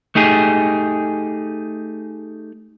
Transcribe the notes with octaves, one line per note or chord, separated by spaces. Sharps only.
A3 D#4 G4 G#4